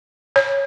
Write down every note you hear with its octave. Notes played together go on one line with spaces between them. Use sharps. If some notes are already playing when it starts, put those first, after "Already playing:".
C#5